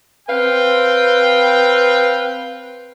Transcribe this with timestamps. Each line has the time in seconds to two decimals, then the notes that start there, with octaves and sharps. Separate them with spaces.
0.29 C4 B4 F5 G5